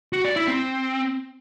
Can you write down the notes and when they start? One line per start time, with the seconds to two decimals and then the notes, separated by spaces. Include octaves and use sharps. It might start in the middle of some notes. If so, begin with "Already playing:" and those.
0.13 F#4
0.25 D5
0.36 E4
0.48 C4